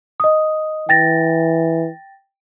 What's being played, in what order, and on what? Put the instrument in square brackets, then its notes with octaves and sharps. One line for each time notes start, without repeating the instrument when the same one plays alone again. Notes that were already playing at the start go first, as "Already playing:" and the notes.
[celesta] D#5 D#6
[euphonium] E3 [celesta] G5 A6 A#6